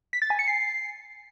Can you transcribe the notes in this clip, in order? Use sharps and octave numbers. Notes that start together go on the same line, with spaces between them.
B6
A6
G#5
C#7
C7